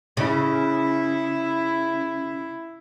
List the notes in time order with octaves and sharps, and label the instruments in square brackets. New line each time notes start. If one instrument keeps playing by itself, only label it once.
[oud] C#3 [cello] E4